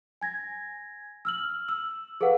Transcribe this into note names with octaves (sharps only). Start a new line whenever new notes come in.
G#5 G#6 A#6
E6 F6 F#7
E6 F#7
G#4 A4 B4 F5 F#5